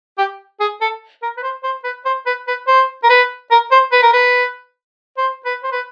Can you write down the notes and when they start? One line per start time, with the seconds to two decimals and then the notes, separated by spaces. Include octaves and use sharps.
0.18 G4
0.60 G#4
0.81 A4
1.22 A#4
1.37 B4
1.43 C5
1.63 C5
1.84 B4
2.05 C5
2.26 B4
2.47 B4
2.67 C5
3.03 A#4
3.09 B4
3.51 A#4
3.71 C5
3.92 B4
4.02 A#4
4.13 B4
5.17 C5
5.45 B4
5.64 C5
5.72 B4